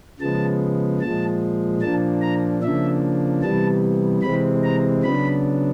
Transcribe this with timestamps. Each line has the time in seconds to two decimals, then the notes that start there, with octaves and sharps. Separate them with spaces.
0.19 C#3 F3 G#3 B3 A5
1.00 A#2 F3 G#3 A5
1.81 A#2 F3 A#3 D4 A5
2.21 A#5
2.62 C#3 F3 A#3 D4 E5
3.42 C3 E3 G3 B3 A5
4.22 C3 E3 G#3 C4 B5
4.63 A#5
5.03 C#3 F#3 B3 D4 B5